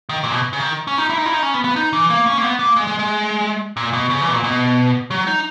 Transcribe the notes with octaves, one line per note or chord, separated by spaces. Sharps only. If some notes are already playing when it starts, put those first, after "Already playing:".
D#3
A#2
B2
C#3
D#3
C#4
D#4
E4
D#4
E4
D#4
C#4
B3
B3
D#4
E3
A#3
C#4
A#3
B3
A#3
G#3
G#3
G#3
A#2
B2
C#3
E3
B2
A#2
B2
F#3
D#4